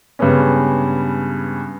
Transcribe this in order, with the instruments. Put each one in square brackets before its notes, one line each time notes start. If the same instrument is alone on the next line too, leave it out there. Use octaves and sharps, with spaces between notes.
[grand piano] G2 C#3 G#3 B3 C#4